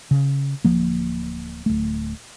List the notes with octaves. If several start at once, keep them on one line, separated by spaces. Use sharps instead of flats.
C#3
D1 F3 A#3
D1 A3